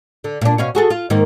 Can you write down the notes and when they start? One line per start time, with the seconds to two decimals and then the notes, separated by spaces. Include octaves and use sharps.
0.24 D3
0.41 A#2 D4
0.58 B2 C#4 F5
0.75 F#4 G#4 A4
0.90 F4
1.10 G#2 D#3 A#3